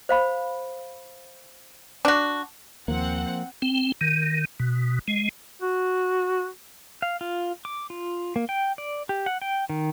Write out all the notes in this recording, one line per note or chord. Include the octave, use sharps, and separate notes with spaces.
C5 F5 B5
D4 F#4
D#2 F3 A#3 C4 F#5
C4
D#3
B2
G#3
F#4
F5
F4
D6
F4
A#3
G5
D5
G4
F#5
G5
D#3